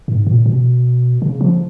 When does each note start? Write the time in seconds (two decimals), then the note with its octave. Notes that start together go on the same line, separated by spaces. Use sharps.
0.08 G#2
0.27 A#2
0.46 B2
1.22 C#3
1.41 F3